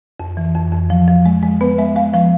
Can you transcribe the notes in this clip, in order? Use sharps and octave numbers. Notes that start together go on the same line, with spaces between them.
F2
E3
F2
F2
F3
F3
G#3
G#3
B3 B4
G#3 E5
G#3 F5
F3 F5